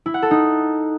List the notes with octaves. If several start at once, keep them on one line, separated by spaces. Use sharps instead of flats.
E4
F#5
A4
D#4